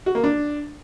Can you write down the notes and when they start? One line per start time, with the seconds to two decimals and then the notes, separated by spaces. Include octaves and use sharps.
0.06 F#4
0.15 A#3
0.24 D4